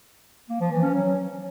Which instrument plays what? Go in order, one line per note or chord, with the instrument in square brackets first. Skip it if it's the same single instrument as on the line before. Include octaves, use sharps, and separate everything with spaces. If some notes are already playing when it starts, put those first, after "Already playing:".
[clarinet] A#3
F3
E3
C#4
F#3